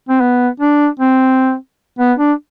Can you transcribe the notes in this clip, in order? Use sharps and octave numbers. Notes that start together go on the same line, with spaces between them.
C4
B3
D4
C4
B3
D4